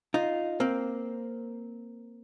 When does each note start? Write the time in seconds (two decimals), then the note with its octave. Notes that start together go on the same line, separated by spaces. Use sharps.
0.14 D#4 F4
0.60 A#3 C4